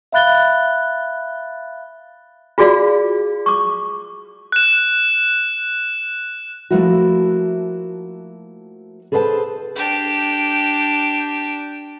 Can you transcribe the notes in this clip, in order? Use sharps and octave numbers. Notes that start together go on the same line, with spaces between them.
E5 F5 B5 F#6 A6 G7
F4 F#4 G#4 D5 F5
C#6 D6
F#6 E7
F3 A3 A#3 E4 F#4
G#4 A4 B4 C5 F5 A5
D4 G4